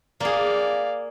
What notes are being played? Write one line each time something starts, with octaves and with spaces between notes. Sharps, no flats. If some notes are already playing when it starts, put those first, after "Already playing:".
A#3 G#4 D5 F5